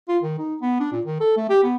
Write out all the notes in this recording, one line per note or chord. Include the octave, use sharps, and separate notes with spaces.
F4
D#3
D#4
B3
D4
A#2
D#3
A4
A3
G4
B3